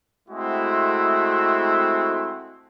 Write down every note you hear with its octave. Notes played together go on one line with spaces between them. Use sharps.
G#3 A3 C4 E4 F#4